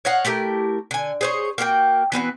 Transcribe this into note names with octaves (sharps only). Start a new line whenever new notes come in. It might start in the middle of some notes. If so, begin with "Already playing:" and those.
C#5 D#5 F5 F#5
A3 E4 G4 A#4
D3 G#5
G#4 C5 C#5
A#3 F#4 G4 G5
E3 B3 C4 F#4